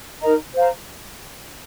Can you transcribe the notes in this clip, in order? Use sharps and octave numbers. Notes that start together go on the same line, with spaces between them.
D#4 A#4 D#5 A#5
C5 F5 A#5